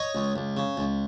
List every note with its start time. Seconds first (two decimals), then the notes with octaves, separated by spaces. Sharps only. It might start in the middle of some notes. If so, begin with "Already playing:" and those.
Already playing: C#5 D#5
0.15 C#2
0.36 C#2
0.57 C#3
0.77 C#2